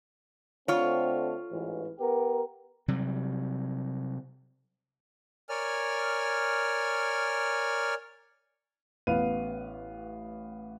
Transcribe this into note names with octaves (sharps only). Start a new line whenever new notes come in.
D3 A3 C4 F4 C#5
A1 G#2 E3
B3 G4 A#4
C3 F#3 G3
A#4 C#5 D5 G#5 F6
A1 B3 B4 F5 D#7